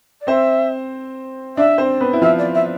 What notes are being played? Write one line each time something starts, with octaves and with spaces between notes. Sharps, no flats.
D5
C4 C5 E5
D4 D5 E5
C4 C5
B3 B4
E4
F3 F4 E5
D5
E5